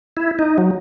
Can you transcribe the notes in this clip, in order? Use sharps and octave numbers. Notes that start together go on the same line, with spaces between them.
E4
D#4
F#3